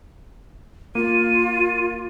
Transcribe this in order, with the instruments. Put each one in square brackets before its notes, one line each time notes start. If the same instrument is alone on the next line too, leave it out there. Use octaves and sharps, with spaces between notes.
[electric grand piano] A#3 [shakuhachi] F4 [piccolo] D#7